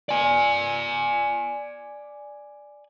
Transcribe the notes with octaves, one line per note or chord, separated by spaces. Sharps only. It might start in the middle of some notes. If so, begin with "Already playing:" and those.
D5 G#5